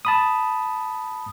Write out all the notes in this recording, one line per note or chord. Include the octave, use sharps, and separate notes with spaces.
A5 B5 D#6